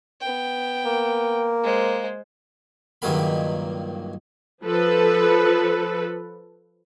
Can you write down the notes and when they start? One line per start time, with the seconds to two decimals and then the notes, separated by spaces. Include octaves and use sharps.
0.21 B3 G5
0.86 A#3
1.64 G#3 C5
3.02 C#2 G2 D#3 F#3 A#3 B5
4.63 F3 A4 B4